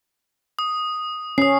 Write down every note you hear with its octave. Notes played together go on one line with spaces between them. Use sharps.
D#6
C#4 D#6 C7